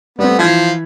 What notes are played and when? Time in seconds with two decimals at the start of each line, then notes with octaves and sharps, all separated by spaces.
0.19 G3 A3 B3 C4
0.39 E3 F3 G#6 B6